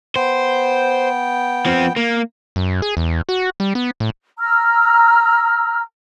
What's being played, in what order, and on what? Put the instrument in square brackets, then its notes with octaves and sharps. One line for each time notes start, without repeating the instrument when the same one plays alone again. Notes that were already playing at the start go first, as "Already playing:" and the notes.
[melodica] B3 G5 [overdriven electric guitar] C5
[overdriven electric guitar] F3 C4
A#3
[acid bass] F#2
G#4
E2
F#4
G3
B3
A2
[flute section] A#5 E6 F6